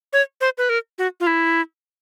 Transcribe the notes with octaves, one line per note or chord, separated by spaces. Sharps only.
C#5
C5
B4
A#4
F#4
F4
E4